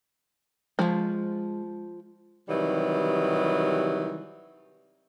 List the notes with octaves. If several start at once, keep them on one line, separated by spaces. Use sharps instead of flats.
F3 G#3 F5
C3 D#3 E3 F#3 G3